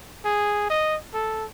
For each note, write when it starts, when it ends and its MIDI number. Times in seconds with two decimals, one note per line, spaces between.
0.25 0.70 68
0.70 0.97 75
1.14 1.46 69